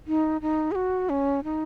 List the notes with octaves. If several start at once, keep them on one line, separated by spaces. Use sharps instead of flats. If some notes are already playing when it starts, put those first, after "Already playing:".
D#4
D#4
G#4
F#4
C#4
D#4